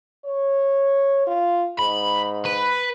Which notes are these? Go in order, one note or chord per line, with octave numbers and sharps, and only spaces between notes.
C#5
F4
G#2 B5
B4 B5